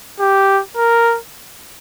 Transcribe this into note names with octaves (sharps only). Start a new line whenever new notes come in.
G4
A#4